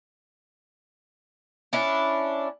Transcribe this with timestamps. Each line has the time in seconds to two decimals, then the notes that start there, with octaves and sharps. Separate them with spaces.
1.73 C#4 D4 E4